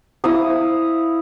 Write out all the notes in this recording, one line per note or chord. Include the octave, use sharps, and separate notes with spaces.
E4 F5 D#6